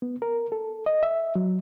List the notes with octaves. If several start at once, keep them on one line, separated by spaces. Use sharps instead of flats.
B3
A#4
A4
D#5
E5
F#3